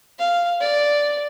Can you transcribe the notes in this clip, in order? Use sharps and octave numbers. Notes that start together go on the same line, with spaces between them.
F5
D5